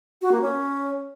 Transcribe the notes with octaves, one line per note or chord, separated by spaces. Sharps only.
F#4
A#3
C#4